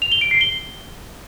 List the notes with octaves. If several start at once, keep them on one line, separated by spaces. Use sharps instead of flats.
F7
G7
D7
C7
G7